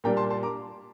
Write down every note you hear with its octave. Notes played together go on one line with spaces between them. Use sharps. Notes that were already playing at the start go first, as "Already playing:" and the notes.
A#2 G3 A#3 D4 G5 A#5
A5 C6
A5 C6
A#5 D6